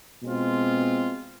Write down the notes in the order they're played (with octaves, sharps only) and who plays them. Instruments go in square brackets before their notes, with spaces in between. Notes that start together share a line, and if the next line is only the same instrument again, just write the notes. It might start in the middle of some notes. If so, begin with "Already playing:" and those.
[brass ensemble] B2 G#3 C4 F4